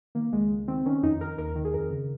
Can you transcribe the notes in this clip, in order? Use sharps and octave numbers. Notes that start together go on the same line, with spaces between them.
D#3 A#3
C#2 G#3
C#2
D#3 C4
D#3 C#4
F2 D#4
D#3 A#4
D#2 A#4
D#3
G#4
F2 A#4
C#3